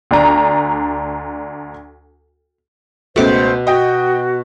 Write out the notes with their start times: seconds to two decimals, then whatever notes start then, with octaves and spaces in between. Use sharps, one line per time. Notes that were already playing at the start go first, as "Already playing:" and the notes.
0.11 D2 D4 A#5
3.16 C#2 B2 A3 C5 D6
3.67 F#4 D#5 G5